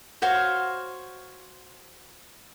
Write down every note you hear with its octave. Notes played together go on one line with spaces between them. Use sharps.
F#4 C5 C#5 F5